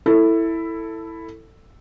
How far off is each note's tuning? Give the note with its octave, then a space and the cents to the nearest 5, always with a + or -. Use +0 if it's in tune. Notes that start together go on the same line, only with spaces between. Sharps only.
E4 +0 A4 +15